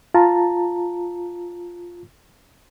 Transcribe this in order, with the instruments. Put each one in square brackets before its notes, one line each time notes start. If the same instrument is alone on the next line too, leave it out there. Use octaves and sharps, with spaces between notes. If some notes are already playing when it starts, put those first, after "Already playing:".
[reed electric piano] F4 A5 A#5